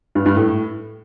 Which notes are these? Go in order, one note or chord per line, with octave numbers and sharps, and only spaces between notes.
G2
G2
A2